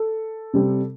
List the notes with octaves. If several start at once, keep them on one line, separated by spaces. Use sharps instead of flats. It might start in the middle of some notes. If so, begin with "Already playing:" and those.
Already playing: A4
C3 G3 C4